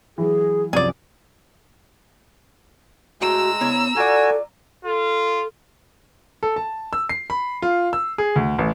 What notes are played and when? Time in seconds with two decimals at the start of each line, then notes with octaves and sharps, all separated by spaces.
0.18 E3 F#3 G#4
0.73 C2 F#2 F3 G#4 D5
3.21 A2 G#3 F#4 G5 A#5 E6
3.61 C#3 B3 E4 C#5
3.96 F4 F#4 A4 D5 G#5
4.85 F4 A4
6.43 A4
6.56 A5
6.93 E6
7.09 C7
7.30 B5
7.62 F4
7.93 E6
8.18 G#4
8.36 D2
8.58 A1